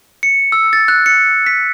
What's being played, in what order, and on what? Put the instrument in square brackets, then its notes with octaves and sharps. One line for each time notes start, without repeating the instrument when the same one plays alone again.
[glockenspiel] C#7
E6
A6
F#6
C#7
B6